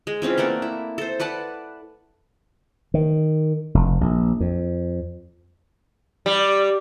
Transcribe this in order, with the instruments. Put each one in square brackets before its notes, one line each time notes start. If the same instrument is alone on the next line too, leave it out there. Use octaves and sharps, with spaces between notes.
[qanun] G#3
E3 C4 C#4 F4
A3 A#3 D5 F#5
E4
A4 C5
B4 D5 F#5 A5
[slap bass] D#3
F1
A#1
F2
[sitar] G3